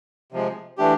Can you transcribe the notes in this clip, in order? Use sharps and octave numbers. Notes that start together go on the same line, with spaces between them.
C3 F3 G#3
E3 A3 D4 G4